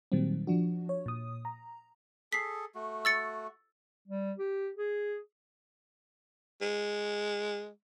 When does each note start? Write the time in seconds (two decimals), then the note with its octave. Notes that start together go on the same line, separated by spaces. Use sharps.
0.12 A#2 D#3 F#3 G3 C4
0.47 F3 D4 F#4
0.89 C#5
1.06 A#2 D#6
1.45 A#5
2.33 G#4 A4 B6 C7
2.75 A3 F#4
3.05 E6 A6 C#7
4.08 G3
4.38 G4
4.77 G#4
6.62 G#3